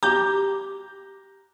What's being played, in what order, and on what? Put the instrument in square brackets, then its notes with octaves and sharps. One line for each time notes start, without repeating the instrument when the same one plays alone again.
[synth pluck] G4 [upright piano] A#5 G6